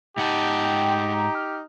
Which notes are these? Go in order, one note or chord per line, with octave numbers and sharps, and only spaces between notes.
G#2 D#4 G4 F#5 A5
G5
A#5
F6